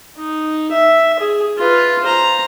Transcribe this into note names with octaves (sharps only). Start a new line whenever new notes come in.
D#4
E5
G#4
F4 B4
C5 A#5